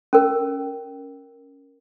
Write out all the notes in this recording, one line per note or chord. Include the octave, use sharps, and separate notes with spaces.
C#4 A#4